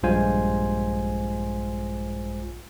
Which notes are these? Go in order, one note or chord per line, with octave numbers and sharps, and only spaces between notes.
A#1 G2 G#3 F4 C5 G#5